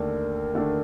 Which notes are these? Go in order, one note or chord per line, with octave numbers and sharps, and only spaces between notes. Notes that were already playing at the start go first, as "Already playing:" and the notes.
Already playing: D#2 D3 A3 D4 A#4
D#2 D3 A3 D4